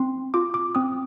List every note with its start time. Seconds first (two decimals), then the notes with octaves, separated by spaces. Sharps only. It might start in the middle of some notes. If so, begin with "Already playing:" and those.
Already playing: C4 C6
0.34 F4 D6
0.54 D6
0.75 C4 D#6